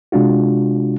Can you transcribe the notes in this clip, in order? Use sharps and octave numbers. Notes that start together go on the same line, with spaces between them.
C3 G#3 D4 F4 F#4